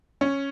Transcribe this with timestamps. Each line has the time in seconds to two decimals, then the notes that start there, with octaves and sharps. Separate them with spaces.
0.21 C#4